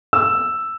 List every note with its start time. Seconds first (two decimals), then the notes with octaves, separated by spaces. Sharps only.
0.13 E6